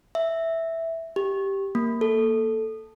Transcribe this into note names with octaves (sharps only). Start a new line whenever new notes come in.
E5
G4
A#3
A4